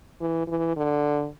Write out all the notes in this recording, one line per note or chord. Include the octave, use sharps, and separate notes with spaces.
E3
E3
D3